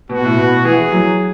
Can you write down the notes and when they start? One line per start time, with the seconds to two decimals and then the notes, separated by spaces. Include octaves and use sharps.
0.09 B2 F#4
0.24 A2
0.37 B2
0.65 E3 G#4
0.92 F#3